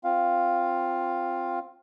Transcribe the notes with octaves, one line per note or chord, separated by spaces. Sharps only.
C4 F4 F5